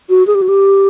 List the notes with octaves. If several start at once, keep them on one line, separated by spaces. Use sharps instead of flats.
F#4
G#4
G4
F#4
G4